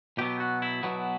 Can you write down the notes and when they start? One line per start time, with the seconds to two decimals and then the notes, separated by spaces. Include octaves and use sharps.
0.18 B2 F#3 B3 G4
0.40 F#4
0.62 E4
0.83 B2 F#3 B3